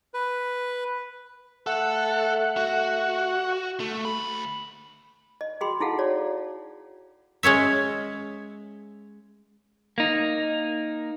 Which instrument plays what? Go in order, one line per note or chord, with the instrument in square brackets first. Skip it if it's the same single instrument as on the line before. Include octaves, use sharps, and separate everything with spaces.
[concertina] B4
[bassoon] A3 [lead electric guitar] A4 [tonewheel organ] F#5
[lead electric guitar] F#4
A3
D2 B5
[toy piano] D#5
F#4 G#4 G5 B5 C6
D#4 E4 G#4 A4 F5 F#5
F#4 C#5 D5
[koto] G#3 C#4 C#5 E5
[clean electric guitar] A#3 D#4